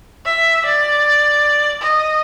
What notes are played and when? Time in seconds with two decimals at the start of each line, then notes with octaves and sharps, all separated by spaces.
0.25 E5
0.65 D5
1.82 D#5